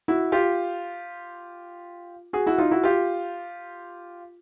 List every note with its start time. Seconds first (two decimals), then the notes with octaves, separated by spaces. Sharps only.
0.08 E4 F#4
0.32 F4 G4
2.33 F#4 G#4
2.46 E4 F#4
2.58 D#4 F4
2.71 E4 F#4
2.84 F4 G4